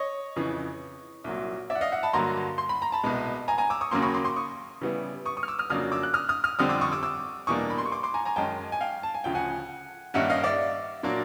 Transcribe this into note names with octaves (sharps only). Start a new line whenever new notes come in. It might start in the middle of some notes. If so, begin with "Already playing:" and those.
Already playing: C#5 D#5
F2 C#3 E3
C2 A#2 F#3
D5 E5
F#5
D#5 F5
E5 F#5
A5 B5
G2 D3 F#3 A#3 A#5 C6
C6
B5
A#5
A5 B5
C2 B2 G#3
G#5 A#5
G#5 A#5
D6 E6
C#6 D#6
D#2 C#3 F#3 A#3 C#4 C6 D6
B5 C#6
C6 D6
C6 D6
C#6 D#6
C#3 E3 G3 B3 E4
C#6 D#6
C#6 D#6
F6
D6 E6
D#6 F6
F2 C#3 F#3 A#3 D4 D#6 F6
D6 E6
F#6
D#6 F6
D#6 F6
D#6 F6
F2 D3 G3 C4 D#6 F6
D6 E6
C#6 D#6
D6 E6
D6 E6
E2 B2 G3 A#3 D4 C#6 D#6
B5
C6
C#6
C6 D6
C6 D6
G#5 A#5
G#5 A#5
F#2 D#3 G#3 C#4 G5 A5
G#5
F5 G5
A5
G#5
D2 C#3 F3 G5
F#5 G#5
G2 D#3 G3 A#3 C#4 E5 F#5
D#5 F5
D5 E5
A#2 F#3 A#3 D4